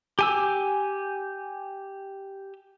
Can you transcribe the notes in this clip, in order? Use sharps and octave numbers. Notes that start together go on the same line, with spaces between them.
G4 G#5 E6